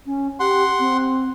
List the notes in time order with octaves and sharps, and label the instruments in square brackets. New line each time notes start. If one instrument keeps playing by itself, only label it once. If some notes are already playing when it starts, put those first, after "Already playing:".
[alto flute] C#4
[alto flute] G4 [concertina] F#5 C6
[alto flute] C4